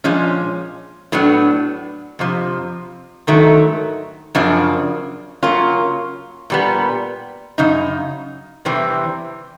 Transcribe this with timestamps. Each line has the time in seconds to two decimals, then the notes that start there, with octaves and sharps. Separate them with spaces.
0.04 A#2 F3 G#3 C#4
1.12 A2 F#3 B3 D4
2.19 F2 C3 F3
3.27 G#2 D#3 F#3 A3
4.35 F#2 C#3 F3 A#3 D4
5.43 C#3 F#3 A#3 C#4 F4
6.50 A#2 G3 B3
7.58 F#2 C#3 D#4
8.65 E2 C3 E3 G3 C4